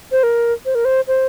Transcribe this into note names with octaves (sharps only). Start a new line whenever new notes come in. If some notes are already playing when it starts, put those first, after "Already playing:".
C5
A#4
C5
A#4
C5
C5